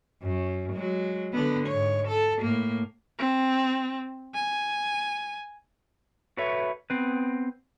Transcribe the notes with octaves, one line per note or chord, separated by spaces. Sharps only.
F#2
F#3 G#3
D3 B3
G#2 C#5
A4
A2 A#3
C4
G#5
F#4 A4 B4 C#5 E5
B3 C4 B4